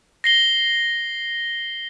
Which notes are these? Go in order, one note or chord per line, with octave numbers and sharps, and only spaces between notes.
A#6 C7 G7